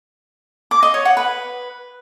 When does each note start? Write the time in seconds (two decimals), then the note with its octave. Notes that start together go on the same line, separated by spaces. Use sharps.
0.71 D6
0.83 D#5
0.94 C#5
1.05 F#5
1.17 B4